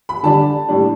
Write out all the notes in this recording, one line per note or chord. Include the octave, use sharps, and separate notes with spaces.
B5
D3 G3 D4 A5
A2 G3 D4